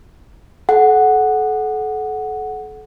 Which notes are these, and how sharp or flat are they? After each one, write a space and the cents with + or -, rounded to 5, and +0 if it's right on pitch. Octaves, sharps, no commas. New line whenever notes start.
A4 -35 F#5 +0